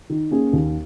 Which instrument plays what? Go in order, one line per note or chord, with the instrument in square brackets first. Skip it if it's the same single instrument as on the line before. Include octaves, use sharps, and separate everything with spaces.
[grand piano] D#3
A#3 C#4 G#4
D#2